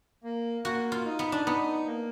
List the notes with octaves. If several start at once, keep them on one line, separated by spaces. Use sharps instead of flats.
A#3
A#3 F#4
F4
D#4
B3
D4
B3 D#4
A#3